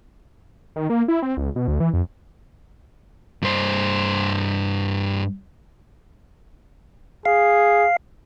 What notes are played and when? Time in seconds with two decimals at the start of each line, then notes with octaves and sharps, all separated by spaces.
0.76 D#3
0.90 A#3
1.08 E4
1.22 C4
1.37 C#2
1.56 B2
1.68 D2
1.80 E3
1.94 F2
3.42 G2 C5
7.25 G#4 F5